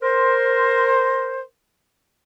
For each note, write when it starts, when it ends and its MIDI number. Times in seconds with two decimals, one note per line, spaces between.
0.01 1.40 70
0.01 1.40 72